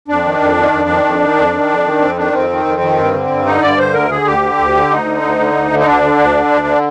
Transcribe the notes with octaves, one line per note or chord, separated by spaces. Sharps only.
F2 D4
D#3
F2
D#3
F2
D#3
F2
D#3
F2
D#3
F2
D#3
F2 C4
D#3 D4
F2 C4
D#3
F2
D#3
G2
D3
G2
D3 D#4
G2 D5
D3 C5
D2 A#4
D3 G#4
D2 G4
D3
D2
D3
D2 D#4
D3
D2
D3
D2
D3
D#4
D2 D4
D3
D2
D3
D2
D3